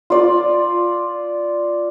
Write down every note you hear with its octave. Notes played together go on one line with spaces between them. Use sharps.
F4 D5